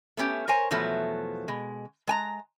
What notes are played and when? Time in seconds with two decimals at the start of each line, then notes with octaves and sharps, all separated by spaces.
0.17 A3 B3 C#4 G4
0.48 A#4 C5 C#5 G#5
0.71 E2 B2 F3 F#3 A3
1.48 B2 G#3
2.07 G#3 G#5 A#5